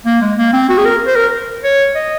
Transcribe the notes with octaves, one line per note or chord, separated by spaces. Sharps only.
A#3
G#3
A#3
C4
F#4
G#4
A#4
C5
A#4
C#5
D#5